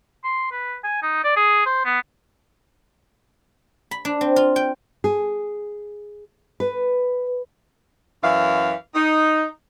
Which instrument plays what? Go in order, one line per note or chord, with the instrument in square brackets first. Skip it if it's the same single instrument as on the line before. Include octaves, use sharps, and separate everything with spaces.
[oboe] C6
B4
G#5
D#4
D5
G#4
C5
B3
[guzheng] B5
D4
C4
F4
G5
[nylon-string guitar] G#4
B4
[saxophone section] F#2 E3 F5
D#4